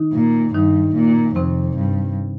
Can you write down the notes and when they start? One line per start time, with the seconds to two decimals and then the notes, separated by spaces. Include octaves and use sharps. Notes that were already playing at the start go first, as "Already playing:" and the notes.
Already playing: D#3 D#4
0.13 A#2
0.54 G2 D#3 D#4
0.95 A#2
1.36 F2 C3 C4
1.76 G2